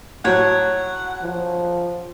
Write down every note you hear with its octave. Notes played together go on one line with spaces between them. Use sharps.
A2 F#3 C#5 F#5
F3